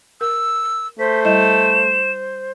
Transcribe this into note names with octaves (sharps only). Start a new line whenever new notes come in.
A#4 E6
A3 C5 B6
G3 E4 D#5 E7